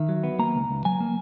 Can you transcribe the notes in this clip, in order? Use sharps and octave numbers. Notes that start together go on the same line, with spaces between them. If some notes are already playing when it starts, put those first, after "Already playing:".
Already playing: D#3 E5
F#3
B3
A#3 A#5
C#2
C#2
F#3 G#5
A#3